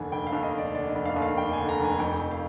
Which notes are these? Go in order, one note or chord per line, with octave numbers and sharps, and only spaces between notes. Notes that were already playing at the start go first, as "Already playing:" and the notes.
Already playing: F1 D#2 D3 G#5
F1 G5
F5
D#2
D#5
F1
D5
D3 D5
D#5
F1
F5
D#2
F5
F1 G5
D3 G#5
A#5
F1
G#5
F2 G5
F1
F5